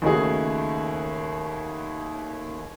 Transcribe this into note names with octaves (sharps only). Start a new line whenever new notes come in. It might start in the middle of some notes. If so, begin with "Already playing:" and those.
D#2 C#3 A3 D#4 F#4 G#4